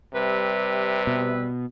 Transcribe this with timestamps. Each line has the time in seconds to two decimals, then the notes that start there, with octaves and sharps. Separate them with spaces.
0.14 C3 G3 B4 E5
1.07 B2